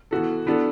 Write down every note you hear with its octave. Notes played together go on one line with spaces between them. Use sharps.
E3 B3 F#4 A4
E3 B3 D4 F#4 A4